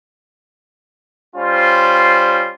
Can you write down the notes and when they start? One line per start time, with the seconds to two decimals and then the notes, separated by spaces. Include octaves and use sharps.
1.36 G3 C#4 F4 C5